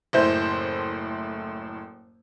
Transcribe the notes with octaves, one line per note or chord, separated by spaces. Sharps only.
F#1 A2 E4 C5 G6